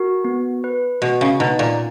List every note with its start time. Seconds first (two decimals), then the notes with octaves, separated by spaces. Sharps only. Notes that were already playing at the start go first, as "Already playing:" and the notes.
Already playing: F#4 A#4
0.24 B3
0.64 B4
1.02 B2 F#4
1.21 C#3
1.40 B2 D#4
1.59 A#2